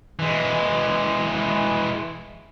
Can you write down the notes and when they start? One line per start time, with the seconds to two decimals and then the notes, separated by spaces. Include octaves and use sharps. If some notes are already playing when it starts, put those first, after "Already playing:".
0.19 E3 G#3